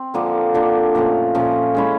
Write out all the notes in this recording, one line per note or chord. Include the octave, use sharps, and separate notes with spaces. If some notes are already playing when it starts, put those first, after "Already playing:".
Already playing: C4
D3 F3 A#3 D4
D3 F3 A#3 D4
A#2 F3 A3 C#4
A#2 F3 A3 C#4
G#3 C#4 E4